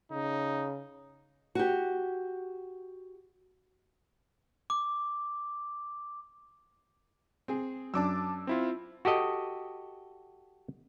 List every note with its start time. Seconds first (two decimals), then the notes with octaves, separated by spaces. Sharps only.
0.12 C#3 D#4
1.55 F#4 G4
4.70 D6
7.48 C4 G#4
7.94 F#2 D4 A5 D6 E6
8.47 C4 E4 F4
9.05 F#4 G4 A4 D#5